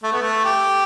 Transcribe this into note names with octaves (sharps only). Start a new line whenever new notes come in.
A3
B3
A3
G4